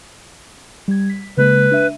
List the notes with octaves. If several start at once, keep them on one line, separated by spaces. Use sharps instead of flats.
G3 G#6
B6
C#3 G#3 A#3 B4
D4 E5 D#7